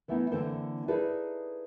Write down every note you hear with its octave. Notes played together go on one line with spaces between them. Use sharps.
E3 A3 B3 D#4 E4
D3 E3 A#3 C4 A4 C5
D#4 E4 G#4 A4 B4 D5